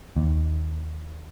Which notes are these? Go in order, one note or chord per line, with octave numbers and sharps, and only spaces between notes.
D#2